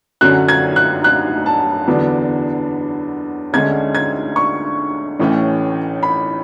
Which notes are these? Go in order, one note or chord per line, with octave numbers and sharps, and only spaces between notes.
F#2 D3 F#3 C#4 F#6
G#6
F#6
F#6
A5
E2 D3 F#3 B3 D4
D2 D3 G#3 C#4 G#6
G#6
C#6
A1 A2 E3 A3 C#4
B5